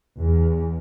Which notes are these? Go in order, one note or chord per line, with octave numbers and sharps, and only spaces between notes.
E2